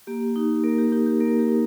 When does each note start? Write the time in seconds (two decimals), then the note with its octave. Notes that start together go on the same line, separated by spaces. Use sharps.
0.07 A#3 G4
0.36 D#4
0.64 A#3 A#4
0.78 G4
0.92 D#4 G4
1.06 G4
1.20 A#3 A#4
1.39 G4
1.49 D#4